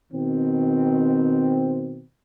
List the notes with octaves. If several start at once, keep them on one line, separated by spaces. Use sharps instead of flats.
B2 D#3 C4